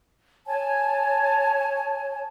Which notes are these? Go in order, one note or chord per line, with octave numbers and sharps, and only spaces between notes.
C#5 G#5 A5